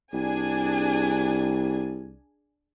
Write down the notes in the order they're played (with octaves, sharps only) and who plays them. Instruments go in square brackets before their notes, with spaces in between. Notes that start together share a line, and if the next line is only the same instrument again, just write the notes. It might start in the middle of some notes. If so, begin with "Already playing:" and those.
[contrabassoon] C2 [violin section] D4 G#4 G#5